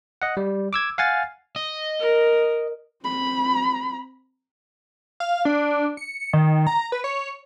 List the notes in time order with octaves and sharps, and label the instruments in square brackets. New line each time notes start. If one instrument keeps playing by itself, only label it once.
[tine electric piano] D#5 F#5
G3
D6 E6 G#6
F5 F#5 G#5 A6
[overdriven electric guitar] D#5
[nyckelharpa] A#4
[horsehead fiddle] C4 B5
[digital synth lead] F5
D4
C#7
C#7
D#3
A#5
B4
C#5